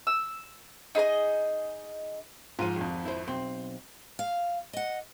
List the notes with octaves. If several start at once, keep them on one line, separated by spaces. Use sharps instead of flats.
E6
D#4 G#4 C5 D#5
G#2 F3 F4 D#7
G#1 F2
E4 C5
B1 C4 G5 C6
F5
D#5 F#5